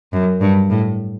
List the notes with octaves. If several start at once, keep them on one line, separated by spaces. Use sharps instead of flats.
F#2
G2
A2